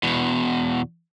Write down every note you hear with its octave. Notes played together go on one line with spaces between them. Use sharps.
E2 B2